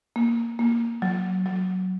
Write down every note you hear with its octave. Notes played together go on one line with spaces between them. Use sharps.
A#3
A#3
F#3
F#3